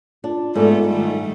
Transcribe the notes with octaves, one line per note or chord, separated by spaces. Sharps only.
D4 F4
G#2 G#3 A3 B3 A4 D5
D#3 G3 A3